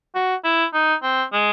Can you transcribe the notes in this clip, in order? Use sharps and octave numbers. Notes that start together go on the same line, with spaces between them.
F#4
E4
D#4
C4
G#3